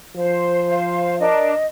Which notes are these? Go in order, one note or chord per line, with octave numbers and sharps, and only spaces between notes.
F3 C5
F5
D4 A#4 D#5